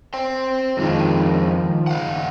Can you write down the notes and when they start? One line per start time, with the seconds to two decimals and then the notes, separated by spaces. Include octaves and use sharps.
0.14 C5 G5
0.77 F2 D#3 F3 G#3
1.87 C#3 F5 F#5